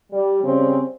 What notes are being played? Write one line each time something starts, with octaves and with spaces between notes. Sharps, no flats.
G3
C#3 G3 C4